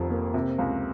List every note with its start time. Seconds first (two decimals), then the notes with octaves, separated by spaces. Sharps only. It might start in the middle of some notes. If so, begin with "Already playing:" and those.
Already playing: F1 F2 D#3
0.10 A#3
0.34 C3
0.59 C#2